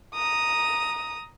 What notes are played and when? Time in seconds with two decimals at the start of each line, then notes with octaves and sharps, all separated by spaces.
0.14 A#5 D#6